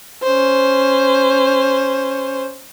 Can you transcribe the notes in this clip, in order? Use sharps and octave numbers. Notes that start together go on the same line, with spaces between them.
C#4 C5